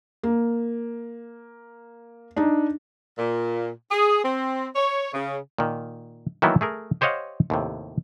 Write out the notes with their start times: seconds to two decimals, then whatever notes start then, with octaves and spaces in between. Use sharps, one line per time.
0.23 A#3
2.37 D4 D#4
3.18 A#2
3.90 G#4
4.24 C4
4.76 C#5
5.14 C#3
5.58 A#2 D#3
6.42 D#3 E3 F#3 A#3 B3 E4
6.61 A3 G#4 A#4
7.01 G4 C5 C#5 D#5 F5 F#5
7.50 D#2 A2 C3